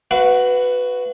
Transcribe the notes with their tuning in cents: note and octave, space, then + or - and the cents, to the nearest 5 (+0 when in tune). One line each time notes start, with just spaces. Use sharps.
F#4 +0 B4 +10 F5 -40